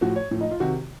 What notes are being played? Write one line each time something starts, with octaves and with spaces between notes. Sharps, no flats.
A2 F3 F#4
C#5
A2 F3
D#4
F4
C3 D#3 F#4